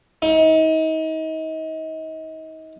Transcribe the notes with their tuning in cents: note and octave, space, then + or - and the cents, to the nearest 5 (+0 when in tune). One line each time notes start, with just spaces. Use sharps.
D#4 +35